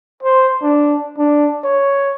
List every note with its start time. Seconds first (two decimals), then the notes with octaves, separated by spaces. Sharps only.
0.23 C5
0.62 D4
1.18 D4
1.64 C#5